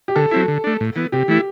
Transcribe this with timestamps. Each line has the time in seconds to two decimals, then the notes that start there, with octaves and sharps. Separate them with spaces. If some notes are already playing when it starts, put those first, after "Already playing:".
0.08 G4
0.16 D3 A4
0.31 F#3 C4 E4
0.48 D3
0.64 A3 D4
0.81 A2
0.96 E3 B3
1.12 C3 G4
1.28 E3 A3 E4